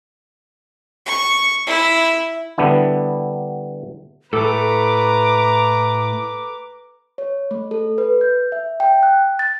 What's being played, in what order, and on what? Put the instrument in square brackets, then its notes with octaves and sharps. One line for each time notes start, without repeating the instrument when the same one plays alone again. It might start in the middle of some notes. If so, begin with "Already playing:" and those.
[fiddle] C#6
E4
[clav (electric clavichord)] D3 G3 B3 D4 E4
[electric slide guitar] A2 A3 [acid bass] A4 [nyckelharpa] B4 A#5 [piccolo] D6
[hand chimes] C#5
A3
A4
B4
G6
E5
G5
F#6
A6